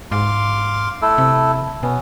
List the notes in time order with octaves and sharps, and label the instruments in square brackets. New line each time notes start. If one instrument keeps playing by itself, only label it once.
[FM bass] G#2 [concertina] F5 C6 D6
[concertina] A3 E4 A4
[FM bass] C3
[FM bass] B2 [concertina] B3 C#4